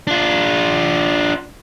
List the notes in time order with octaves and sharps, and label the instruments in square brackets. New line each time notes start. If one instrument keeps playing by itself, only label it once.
[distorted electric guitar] D4 F4